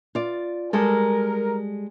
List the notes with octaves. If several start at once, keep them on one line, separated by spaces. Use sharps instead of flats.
F4 D5
G3 G#3 A4 A#4